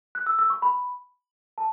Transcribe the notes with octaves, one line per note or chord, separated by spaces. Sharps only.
F#6
E6
E6
C#6
B5
A5